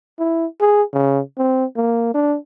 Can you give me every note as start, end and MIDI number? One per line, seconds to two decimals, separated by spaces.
0.19 0.46 64
0.60 0.82 68
0.93 1.20 49
1.38 1.65 60
1.76 2.12 58
2.14 2.36 62